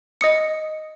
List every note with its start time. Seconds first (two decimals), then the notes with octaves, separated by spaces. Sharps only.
0.21 D#5 D#6 C#7